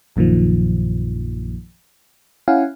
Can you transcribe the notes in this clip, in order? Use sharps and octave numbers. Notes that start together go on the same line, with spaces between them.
A#1 F#2 A#2 D#3 F3
C#4 E4 F5 F#5 G#5